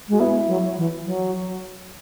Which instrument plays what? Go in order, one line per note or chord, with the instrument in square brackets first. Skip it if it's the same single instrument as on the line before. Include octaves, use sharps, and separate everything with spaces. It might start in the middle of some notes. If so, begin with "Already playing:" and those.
[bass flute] G#3 [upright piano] F#4
[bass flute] B3 [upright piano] E4
[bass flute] F#3
E3
F#3